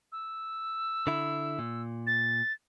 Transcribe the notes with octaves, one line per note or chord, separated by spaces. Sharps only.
E6
D3 E4
A#2
A6